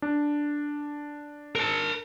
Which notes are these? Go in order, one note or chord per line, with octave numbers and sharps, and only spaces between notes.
D4
A#4 A5